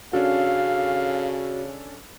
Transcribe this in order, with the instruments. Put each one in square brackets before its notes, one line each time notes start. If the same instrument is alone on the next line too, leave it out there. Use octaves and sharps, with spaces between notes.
[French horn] C#3 [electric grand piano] C#4 D4 A4 [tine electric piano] F#4 [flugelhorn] F5